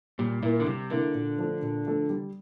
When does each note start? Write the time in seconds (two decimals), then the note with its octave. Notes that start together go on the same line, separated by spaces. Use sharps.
0.19 A#2 G3
0.43 A#2 A#3 E4
0.60 D3
0.66 C3 G3
0.90 D3 A#3 E4
1.14 A#2
1.38 F3 A3 D4 A4
1.62 A#2
1.86 F3 A3 D4 A4
2.10 G3